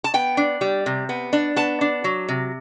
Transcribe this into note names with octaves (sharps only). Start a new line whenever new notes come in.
A5
B3 G5
D4
G3
C3
B3
D4
B3 A5
D4
F#3
C3